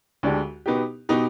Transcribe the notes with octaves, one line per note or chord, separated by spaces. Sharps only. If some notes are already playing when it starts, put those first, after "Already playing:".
D2 D3 G#3 D4 G4
B2 B3 D#4 G4
B2 B3 D#4 G4